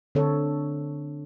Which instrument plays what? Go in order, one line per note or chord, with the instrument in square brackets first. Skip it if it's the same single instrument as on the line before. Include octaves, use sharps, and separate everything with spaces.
[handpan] D3 C4 A4 C#5